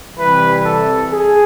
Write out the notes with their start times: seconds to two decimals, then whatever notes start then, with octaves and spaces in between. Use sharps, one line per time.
0.17 C3 E3 G3 B4
0.64 A4
1.11 G#4